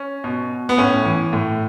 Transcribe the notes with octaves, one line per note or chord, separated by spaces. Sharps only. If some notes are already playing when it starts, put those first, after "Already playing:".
Already playing: C#4
B2
B3
A2 C#4
E3
A2